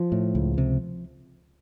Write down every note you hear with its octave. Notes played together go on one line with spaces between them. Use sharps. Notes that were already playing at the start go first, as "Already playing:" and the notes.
Already playing: F3
A2
C#2
C3